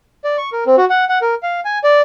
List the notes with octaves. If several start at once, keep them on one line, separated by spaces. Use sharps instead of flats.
D5
C#6
A#4
C4
F#4
F#5
F#5
A#4
F5
G#5
D5